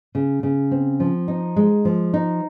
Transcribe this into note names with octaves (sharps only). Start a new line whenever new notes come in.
C#3
C#3
C4
F3
D#4
G#3
F3
D#4